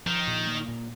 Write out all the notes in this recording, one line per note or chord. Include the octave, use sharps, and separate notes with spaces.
D#3 F3
A#2
A#3
A#2